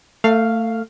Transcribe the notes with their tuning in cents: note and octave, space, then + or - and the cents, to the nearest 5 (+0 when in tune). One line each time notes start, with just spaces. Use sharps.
A3 +25 F5 +0